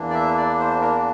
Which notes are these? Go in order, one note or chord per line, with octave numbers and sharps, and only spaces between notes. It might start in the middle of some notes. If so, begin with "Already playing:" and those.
Already playing: E2 E3 A#3 D4
D5
E5
D5
C5
A#4